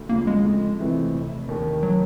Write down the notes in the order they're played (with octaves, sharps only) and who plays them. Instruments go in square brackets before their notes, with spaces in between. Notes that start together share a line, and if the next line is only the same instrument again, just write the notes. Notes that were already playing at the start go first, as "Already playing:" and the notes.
Already playing: [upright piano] D2
[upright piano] C#3 F3 [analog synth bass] A#3
[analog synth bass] G#3
[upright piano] F2
C3 E3 A3 C4
F1
D#2 D#3
[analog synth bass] F#3